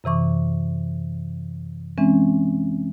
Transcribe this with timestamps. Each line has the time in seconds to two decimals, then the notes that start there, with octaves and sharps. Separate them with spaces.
0.04 F#2 C3 E3 C#6 D6
1.98 E3 G#3 C4 C#4